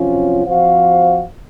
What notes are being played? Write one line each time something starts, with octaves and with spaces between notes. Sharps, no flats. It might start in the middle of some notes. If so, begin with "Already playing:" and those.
Already playing: F2 C3 F#3 C#4 F4
F3 C4 F#4 C5 F5